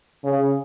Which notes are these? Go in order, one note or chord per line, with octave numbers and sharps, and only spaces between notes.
C#3